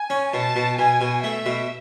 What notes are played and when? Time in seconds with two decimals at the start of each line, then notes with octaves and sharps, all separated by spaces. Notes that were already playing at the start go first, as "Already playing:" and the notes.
Already playing: G#5
0.10 C#4
0.34 B2 A5
0.56 B2
0.78 B2 G#5
1.01 B2
1.24 A3 E5
1.46 B2